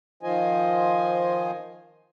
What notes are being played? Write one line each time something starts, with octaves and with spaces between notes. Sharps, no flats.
D#3 F3 F4 C5 D#5 G#5